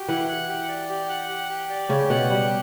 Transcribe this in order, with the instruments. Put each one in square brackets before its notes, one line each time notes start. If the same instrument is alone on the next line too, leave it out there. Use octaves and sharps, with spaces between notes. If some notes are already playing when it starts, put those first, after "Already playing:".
Already playing: [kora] F#4 [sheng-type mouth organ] G4
[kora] E3 E4 [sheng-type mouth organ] F#5
[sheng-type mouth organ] F#5
G4
D5
G4
F#5
G4
G4
D5
[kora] C#3 C#4 [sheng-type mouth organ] G4
[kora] B2 B3 [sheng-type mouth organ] F#5
[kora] G3 [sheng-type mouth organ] G4